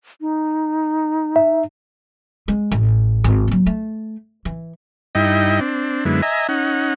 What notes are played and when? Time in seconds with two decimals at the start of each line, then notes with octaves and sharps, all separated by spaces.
0.21 D#4
1.36 E5
2.48 G#3
2.72 A1
3.24 G#1
3.48 F#3 A#3
3.66 A3
4.45 E3
5.15 G2 D#4 E4 D#5 G5
5.61 C4 D4
6.05 F#2 D3 G#3 B3 E4
6.22 D#5 E5 G#5 A#5
6.49 C#4 D#4 F#5